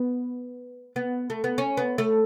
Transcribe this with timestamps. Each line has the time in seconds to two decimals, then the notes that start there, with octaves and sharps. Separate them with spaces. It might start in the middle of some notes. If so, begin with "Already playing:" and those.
Already playing: B3
0.96 B3
1.30 A3
1.44 B3
1.58 C#4
1.77 B3
1.98 A3